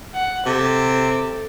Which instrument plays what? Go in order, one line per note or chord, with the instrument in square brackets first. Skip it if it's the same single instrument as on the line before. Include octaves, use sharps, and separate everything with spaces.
[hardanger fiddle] F#5
[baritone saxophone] C3 [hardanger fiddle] A4